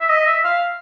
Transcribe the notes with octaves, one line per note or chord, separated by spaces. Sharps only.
E5
D#5
E5
F5